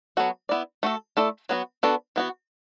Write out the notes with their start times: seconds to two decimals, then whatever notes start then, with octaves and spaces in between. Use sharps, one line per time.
0.17 F#3 B3 F#4 A4
0.49 B3 E4 D5
0.83 A3 F#4 A4
1.17 A3 E4 A4 D5
1.49 F#3 B3 F#4
1.83 B3 D4 F#4 A4
2.16 E3 B3 F#4